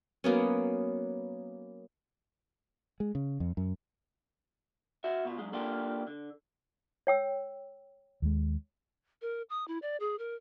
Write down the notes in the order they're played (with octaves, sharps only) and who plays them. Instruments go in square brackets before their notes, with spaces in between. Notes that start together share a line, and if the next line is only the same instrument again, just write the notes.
[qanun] F#3 A#3 B3 C#4
[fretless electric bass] G#3
C#3
F2
F#2
[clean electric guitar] F#4 E5
B2 F4
F#2 G#3
A#3 D4 F4 G4 A4
D3
[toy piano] C#5 G5 E6
[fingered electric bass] D#2 G#3
[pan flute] A#4
D#6
E4
D5
G#4
A#4